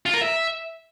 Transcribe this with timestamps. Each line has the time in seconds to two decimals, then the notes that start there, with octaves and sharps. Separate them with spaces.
0.06 F4
0.14 A#4
0.21 E5